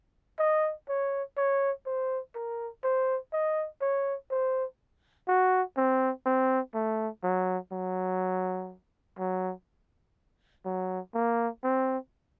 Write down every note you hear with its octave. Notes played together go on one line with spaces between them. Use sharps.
D#5
C#5
C#5
C5
A#4
C5
D#5
C#5
C5
F#4
C4
C4
A3
F#3
F#3
F#3
F#3
A#3
C4